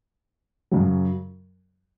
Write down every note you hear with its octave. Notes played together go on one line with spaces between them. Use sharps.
F#2 C#3 F#3